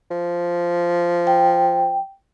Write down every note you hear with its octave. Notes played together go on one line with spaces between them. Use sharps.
F3
G5